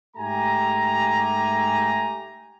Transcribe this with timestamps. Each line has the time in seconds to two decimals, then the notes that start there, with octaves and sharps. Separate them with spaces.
0.17 G#2 A3 G4 G#5 A#5